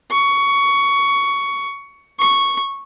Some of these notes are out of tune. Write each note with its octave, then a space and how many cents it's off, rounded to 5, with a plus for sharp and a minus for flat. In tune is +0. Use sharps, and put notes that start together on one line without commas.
C#6 +15
C#6 -5